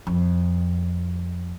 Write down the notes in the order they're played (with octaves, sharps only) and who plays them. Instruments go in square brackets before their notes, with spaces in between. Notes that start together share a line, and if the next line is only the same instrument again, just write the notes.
[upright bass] F2